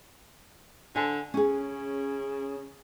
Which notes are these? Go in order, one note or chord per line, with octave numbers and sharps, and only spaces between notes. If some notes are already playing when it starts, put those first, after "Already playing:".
D3 C5 G#5
C#3 C#4 G#4